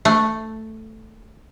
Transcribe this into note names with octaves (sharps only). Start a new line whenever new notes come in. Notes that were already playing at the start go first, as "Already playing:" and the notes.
A3